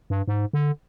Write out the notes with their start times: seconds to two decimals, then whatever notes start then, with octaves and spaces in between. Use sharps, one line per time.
0.10 G2
0.28 G#2
0.53 D3